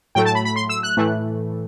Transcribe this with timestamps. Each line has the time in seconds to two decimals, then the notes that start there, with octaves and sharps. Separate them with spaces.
0.15 A2 F#3 A3 G5
0.25 A5
0.35 B5
0.45 B5
0.56 C6
0.69 E6
0.83 F#6
0.97 A2 E3 A3